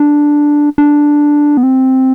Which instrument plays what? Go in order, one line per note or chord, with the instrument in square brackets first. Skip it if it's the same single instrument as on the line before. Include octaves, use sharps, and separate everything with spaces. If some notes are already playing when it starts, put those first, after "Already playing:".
Already playing: [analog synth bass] D4
D4
B3
C4